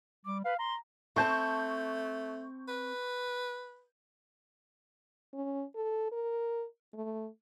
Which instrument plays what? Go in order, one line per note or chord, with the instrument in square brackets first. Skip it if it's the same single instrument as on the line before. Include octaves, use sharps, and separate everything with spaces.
[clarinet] G3 [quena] D6
[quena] B4 [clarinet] F5
[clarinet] A#5 [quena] C6
[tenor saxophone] A3 [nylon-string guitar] C4 G#5 A5 [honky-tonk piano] C#6 G6
[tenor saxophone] B4
[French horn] C#4
A4
A#4
A3